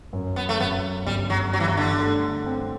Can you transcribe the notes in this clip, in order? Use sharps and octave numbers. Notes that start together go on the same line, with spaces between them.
F#2
B3
A3
F#2 B3
G1 G3
F#3
F#3 G3
E3
F#3
D3
A3
C4